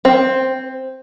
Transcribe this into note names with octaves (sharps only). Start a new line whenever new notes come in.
C4